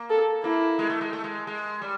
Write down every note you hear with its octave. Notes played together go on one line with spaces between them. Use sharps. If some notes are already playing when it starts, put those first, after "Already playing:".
Already playing: A#3
A4
A#3 E4
G#3
A3
G#3
A3
G#3
G#3
G3